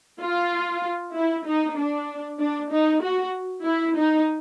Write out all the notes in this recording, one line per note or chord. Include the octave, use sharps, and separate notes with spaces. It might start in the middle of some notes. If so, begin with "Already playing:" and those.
F4
E4
D#4
D4
D4
D#4
F#4
E4
D#4